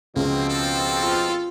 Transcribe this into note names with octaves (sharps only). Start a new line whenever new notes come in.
C#2 B2 F3 A#3 C4
A4
F4